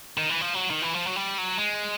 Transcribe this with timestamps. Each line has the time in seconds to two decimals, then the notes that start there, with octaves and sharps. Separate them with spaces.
0.17 D#3
0.29 E3
0.41 F3
0.54 F#3
0.70 D#3
0.82 E3
0.94 F3
1.06 F#3
1.16 G3
1.38 F#3
1.58 G#3